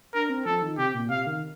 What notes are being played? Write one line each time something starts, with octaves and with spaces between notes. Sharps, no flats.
D4 A#4
C4
F3 A4
D#3
C3 G4
A#2
C3 F5
D#3